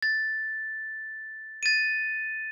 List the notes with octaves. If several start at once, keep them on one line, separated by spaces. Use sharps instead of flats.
A6
A6 D#7